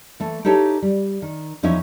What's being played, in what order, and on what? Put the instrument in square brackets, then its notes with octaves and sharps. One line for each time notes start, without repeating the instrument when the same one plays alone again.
[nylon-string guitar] E3 A3
D#4 E4 G4 A4 C#5 D#5
G3
D#3
E2 F3 C#4 D#4 E4 E5